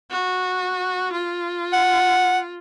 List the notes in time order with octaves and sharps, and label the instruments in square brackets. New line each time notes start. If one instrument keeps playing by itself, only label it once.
[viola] F#4
F4
[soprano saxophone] F#5